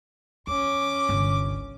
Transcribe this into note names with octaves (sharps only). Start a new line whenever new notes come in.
E2 C#4 D6
G1 C2